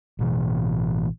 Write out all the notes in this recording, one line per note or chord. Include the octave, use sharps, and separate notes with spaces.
A1 B2 E3